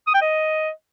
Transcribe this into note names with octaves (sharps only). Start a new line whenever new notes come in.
D#6
G5
D#5